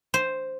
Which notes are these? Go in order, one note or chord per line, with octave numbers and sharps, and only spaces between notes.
C5